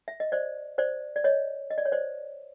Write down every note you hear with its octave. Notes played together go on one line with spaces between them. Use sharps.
E5
D#5
C5 D5
C5 D5
D5
C#5 D#5
D#5
D5
C#5
C5 D5